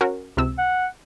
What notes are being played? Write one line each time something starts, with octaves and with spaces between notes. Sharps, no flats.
C#4 F#4 A#4
C#2 C3 E6
F#5